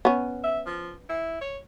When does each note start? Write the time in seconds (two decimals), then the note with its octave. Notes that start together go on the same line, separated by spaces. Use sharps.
0.05 B3 C#4
0.44 E5
0.67 F3
1.09 E4
1.41 C#5